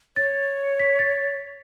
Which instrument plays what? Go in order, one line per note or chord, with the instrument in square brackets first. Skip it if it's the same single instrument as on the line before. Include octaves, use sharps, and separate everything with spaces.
[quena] C#5 [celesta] A6
[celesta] B6
A6